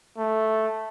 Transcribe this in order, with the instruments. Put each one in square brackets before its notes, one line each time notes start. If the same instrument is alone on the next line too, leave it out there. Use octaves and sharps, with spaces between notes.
[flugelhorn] A3